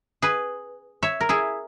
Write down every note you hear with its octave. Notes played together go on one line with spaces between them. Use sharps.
G#4 B4
C#5 E5
A#4
E4 G#4